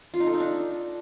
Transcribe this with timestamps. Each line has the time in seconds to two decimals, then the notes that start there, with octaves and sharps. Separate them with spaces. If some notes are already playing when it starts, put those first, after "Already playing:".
0.14 F4
0.20 D#4
0.27 A4
0.33 D#4
0.40 D4